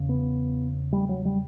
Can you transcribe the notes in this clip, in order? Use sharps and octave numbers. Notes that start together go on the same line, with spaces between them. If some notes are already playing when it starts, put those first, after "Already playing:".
Already playing: E2 C#3
B3
G3
F#3
G3